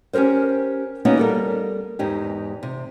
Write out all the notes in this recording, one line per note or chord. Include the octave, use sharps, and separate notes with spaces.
C#4 G4 A4 A#4 C5
A#3 B3 C#4 D#4 F#4
G3 A4 A#4
E2 G#2 D#4 G4
C3